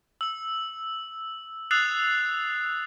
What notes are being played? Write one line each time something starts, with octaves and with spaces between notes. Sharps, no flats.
E6 F#7
D#6 E6 F#6 A6 C7 F7